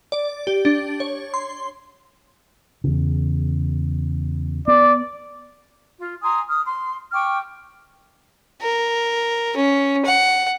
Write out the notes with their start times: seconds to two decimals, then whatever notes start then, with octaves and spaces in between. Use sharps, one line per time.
0.12 D5
0.47 G4
0.65 D4
1.00 C#5
1.34 C6
2.84 E2 C#3
4.68 B3 D5
5.98 F4
6.22 G#5 A#5 C6 D#6
6.49 D#6 F6
6.65 C6
7.12 G5 C#6 D6 F6
8.62 A#4
9.57 C#4
10.06 F#5